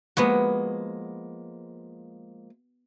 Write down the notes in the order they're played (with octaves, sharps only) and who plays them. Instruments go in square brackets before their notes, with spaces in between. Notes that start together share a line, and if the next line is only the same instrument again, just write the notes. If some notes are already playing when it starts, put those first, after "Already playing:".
[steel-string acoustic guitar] F3 G#3 A#3 [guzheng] B3 F#4